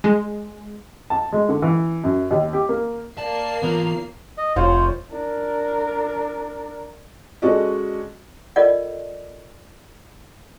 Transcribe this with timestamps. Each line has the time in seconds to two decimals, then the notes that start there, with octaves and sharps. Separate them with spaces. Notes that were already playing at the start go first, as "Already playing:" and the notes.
0.04 G#3
1.10 A5
1.33 G#3
1.49 D3
1.62 E3
2.04 F#2
2.31 D#2
2.53 G4
2.69 A#3
3.18 A#3 D5 A5 C7
3.62 E3 B3 F4 C#5 A#5
4.38 D#5
4.56 F1 F4 C5 C#5
5.10 D4 A#4
7.42 G#3 C#4 F#4 A4 D5 D#5
8.56 F4 A4 A#4 D5 D#5 F#5